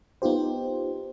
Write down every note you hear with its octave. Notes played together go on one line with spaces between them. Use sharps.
B3 D#4 F4 G4 C5